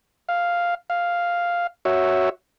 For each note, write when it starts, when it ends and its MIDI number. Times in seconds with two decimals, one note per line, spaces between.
0.29 0.75 77
0.90 1.67 77
1.85 2.29 66
1.85 2.29 73
1.85 2.29 76